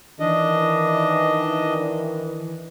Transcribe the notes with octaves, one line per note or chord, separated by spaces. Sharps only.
D#3 E3 D4 D#5